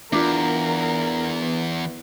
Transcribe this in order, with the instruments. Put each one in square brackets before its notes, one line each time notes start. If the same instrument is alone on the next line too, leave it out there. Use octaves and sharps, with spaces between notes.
[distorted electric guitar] E2 [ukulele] D4 F4 [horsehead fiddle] A#4
[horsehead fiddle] B3